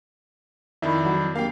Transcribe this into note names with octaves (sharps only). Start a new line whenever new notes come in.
F2 D#3 E4 D5 B5
F#3
A#3 D4 G4 F5 G5 C7